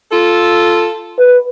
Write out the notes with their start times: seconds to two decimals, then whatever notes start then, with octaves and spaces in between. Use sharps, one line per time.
0.11 F4 A4
1.19 B4